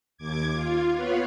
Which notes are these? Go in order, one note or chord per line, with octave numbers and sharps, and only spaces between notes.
D#2 D6 G#6
F4
B3 F4 B4 C#5 F5